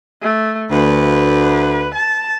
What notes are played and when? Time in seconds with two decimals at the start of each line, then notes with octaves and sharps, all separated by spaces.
0.22 A3
0.71 D2 B4
1.95 A5